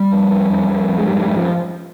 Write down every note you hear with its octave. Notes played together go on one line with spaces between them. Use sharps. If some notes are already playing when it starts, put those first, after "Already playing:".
Already playing: G3
F2
F2
F2
F2
F2
G#3
G#2 G3
G3
G#2
F3